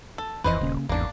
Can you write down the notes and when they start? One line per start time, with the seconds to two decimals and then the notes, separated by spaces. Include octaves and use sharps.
0.18 A4
0.44 D#1 F2 E3 F3 B4 C5 D#5
0.61 D#1 C#3 A#3 C#4
0.89 G#1 E2 A#3 D4